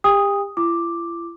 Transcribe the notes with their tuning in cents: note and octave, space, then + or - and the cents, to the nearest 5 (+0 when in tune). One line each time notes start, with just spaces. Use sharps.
G4 +30 G5 +45 D#6 +0
E4 +45 D6 +0